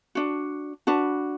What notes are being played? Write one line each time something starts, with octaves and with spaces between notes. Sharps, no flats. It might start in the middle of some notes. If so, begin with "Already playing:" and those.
D4 F#4
D4 F#4 B4